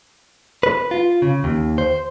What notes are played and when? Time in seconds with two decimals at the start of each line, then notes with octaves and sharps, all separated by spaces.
0.63 B4
0.91 F4
1.22 C#3
1.44 D#2
1.78 C5